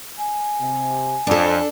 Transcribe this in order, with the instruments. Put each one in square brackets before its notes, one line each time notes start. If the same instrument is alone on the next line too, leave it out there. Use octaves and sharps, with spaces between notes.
[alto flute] G#5
[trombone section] C3
[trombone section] F2 [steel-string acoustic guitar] D4 A4